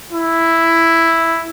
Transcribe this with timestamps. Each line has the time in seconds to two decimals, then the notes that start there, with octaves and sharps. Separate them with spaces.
0.13 E4